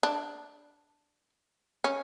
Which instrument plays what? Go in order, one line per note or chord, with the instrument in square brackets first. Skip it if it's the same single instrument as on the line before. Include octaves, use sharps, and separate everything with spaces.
[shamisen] D4
C#4